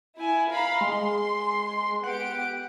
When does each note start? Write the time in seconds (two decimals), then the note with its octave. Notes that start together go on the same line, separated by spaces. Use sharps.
0.17 E4 G#5
0.50 F5 A#5 B5
0.81 G#3 C6
2.03 B3 G4 F#5 D7